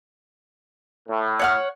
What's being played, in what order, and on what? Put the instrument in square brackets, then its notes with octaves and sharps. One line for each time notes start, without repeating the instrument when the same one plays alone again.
[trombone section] A2
[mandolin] C#5 F#5 F6